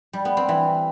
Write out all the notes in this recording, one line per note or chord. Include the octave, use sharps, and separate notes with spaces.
G3
B3
C4
E3